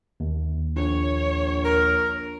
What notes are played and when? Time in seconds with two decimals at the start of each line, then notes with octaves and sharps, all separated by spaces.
0.20 D#2
0.76 A#1 C#5
1.65 A#4